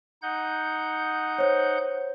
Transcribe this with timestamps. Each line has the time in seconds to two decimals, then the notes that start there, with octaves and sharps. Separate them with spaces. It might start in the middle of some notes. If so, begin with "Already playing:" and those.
0.22 D#4 F#5 G6
1.38 C5 C#5